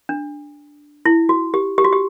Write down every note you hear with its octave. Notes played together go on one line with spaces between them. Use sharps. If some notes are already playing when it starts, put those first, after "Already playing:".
D4
E4
F#4
G4
G4
F#4
G4